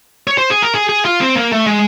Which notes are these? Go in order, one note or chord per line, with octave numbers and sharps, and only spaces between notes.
C#5
C5
G#4
A#4
G#4
G#4
F4
C4
A#3
A3
G#3